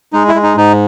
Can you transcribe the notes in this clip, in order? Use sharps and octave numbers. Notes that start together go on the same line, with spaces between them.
G#3 D#4
E4
G#3
D#4
G#2 D#4